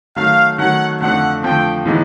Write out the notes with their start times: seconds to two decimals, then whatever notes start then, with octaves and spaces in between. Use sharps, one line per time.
0.16 D#3 F#3 A3 C#4 F5
0.58 D#3 F#3 A3 C#4 F#5
1.01 F2 D3 F3 A3 F#5
1.43 F2 D3 F3 A3 G5
1.85 A2 E3 G#3 B3 D#4